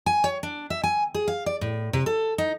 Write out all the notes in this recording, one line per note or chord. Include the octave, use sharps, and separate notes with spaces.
G#5
C#5
D4
E5
G#5
G#4
F5
D5
A2
C3
A4
D#4